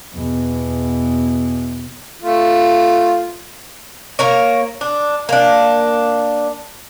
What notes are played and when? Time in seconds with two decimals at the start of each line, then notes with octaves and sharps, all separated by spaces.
0.13 E2 B2
2.22 A3 F4
4.19 A#3 A#4 C#5
4.81 D4
5.29 A#3 D4